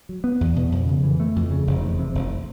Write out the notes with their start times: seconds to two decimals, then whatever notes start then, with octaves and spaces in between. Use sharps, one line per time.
0.09 F#3
0.24 B3
0.41 E2
0.56 B2
0.72 F2
0.88 C#3
1.04 E3
1.20 A3
1.36 F2
1.51 C#3
1.67 F1
1.82 E2
1.99 C3
2.15 F1